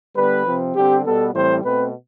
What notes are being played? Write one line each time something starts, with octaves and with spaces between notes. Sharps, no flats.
D3 G3 B3 B4
C3 F3 C4
D3 G3 C4 G4
B2 G3 B3 A4
A2 E3 G3 C4 C5
B2 A3 C4 B4